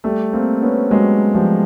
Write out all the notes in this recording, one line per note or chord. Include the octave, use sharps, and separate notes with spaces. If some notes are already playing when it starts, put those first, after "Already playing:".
G3 A3
A#3 C4
B3 C#4
F#3 G#3
F3 G3